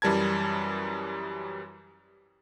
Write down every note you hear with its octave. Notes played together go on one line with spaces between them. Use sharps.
F#2 E3 G3 A#4 A5 G#6